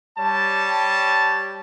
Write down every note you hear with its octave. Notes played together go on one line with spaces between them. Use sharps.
G3 C#5 A5